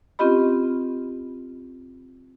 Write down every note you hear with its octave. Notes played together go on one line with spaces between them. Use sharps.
C4 C#4 F4 G4 D#5 B5